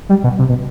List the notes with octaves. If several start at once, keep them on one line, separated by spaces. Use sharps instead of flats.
G3
B2
C3
B2